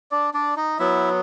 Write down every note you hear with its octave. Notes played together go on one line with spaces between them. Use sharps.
D4 D5
D4 D5
D#4 D#5
F#3 B3 E4 E5